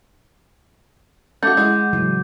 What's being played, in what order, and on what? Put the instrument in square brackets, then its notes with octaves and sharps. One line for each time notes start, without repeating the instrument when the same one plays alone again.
[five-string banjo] A3 F#4 [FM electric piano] C#4 E5 F5 [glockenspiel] D6 G6
[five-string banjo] G#3 [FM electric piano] E4 F#5
[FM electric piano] A2 C#3 E3 [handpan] F#3